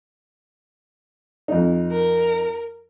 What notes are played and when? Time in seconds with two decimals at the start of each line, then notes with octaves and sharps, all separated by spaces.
1.48 F2 D#4
1.92 A#4